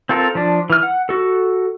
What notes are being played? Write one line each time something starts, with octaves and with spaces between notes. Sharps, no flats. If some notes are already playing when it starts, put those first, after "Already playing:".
C4 F4 A4 A#4
F3 D4
E3 F6
F#5
F#4 A4